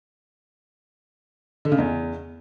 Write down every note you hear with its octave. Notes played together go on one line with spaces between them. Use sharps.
D3
C#3
E2